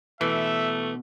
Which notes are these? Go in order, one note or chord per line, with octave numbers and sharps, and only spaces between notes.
B2 E3 A3 E5